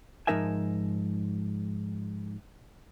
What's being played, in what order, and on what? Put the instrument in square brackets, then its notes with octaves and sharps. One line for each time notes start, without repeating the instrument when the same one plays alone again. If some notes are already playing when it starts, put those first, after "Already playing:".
[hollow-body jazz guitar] G#2 F3 D#4 A#4 E5 G#5